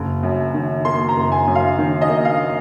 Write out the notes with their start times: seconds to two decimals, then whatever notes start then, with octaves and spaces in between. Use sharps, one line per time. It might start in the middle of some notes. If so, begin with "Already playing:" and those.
Already playing: F#1
0.23 F#2
0.54 D#3
0.85 A#3 C6
1.09 A#5
1.16 F#1
1.32 G#5
1.47 F#2
1.55 F5
1.78 D#3
2.01 D#5
2.09 A#3
2.25 F5